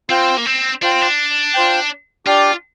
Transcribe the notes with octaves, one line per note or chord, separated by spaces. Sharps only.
C4 F4 C5 G5
A#3
C4
D4 F4 C5 G5
C4
D4
F4 C5 G5
D4 F4 G4 D5 G5